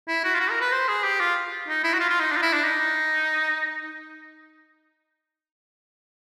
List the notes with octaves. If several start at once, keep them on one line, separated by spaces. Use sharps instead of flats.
E4
F#4
F4
F#4
A#4
B4
C5
G#4
G4
F4
D#4
E4
F#4
F4
F4
D#4
D4
F4
E4
D4
D#4